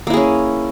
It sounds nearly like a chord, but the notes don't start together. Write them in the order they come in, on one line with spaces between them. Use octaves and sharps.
A#3 E4 G#4 C#4